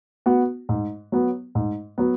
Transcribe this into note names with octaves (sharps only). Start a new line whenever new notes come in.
B3 F#4
G#2
F#3 B3
G#2
F#3 B3